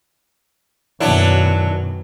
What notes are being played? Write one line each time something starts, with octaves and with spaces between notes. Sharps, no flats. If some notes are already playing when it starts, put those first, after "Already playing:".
F#2 B2 D#3 F#3 D4 E4